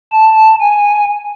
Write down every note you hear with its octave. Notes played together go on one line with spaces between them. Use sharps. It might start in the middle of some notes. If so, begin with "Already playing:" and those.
A5
G#5